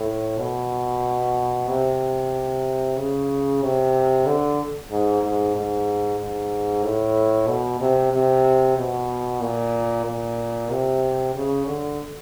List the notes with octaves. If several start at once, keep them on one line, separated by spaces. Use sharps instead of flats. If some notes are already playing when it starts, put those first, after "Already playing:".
Already playing: A2
B2
C3
C#3
C3
D3
G#2
G#2
G#2
G#2
A2
B2
C3
C3
B2
A#2
A#2
C3
C#3
D3